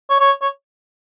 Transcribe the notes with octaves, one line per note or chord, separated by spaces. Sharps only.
C#5
C#5
C#5